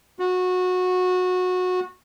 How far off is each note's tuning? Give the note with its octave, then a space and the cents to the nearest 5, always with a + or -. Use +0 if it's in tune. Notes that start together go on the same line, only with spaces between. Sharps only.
F#4 -20